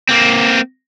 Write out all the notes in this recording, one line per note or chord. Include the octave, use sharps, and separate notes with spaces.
A#3 C4